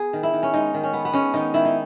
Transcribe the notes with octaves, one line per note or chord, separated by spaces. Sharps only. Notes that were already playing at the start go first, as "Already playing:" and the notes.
Already playing: B3 G#4
D#3
E4
D#3
C#4
G#3 D#4
D#3
C#4
B3
B3
G#3 C#4
D#3 D#4
D#3 E4
D#4